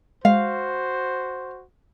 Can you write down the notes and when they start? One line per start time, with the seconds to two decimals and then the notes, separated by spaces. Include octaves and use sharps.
0.25 G#3 F#4 C5 F5